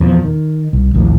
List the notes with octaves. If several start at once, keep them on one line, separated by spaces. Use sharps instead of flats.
E2 A#2 F3
D#3
C2
A#1 D#2 A2